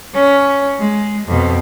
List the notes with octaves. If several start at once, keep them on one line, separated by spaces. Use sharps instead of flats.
C#4
G#3
F2 B2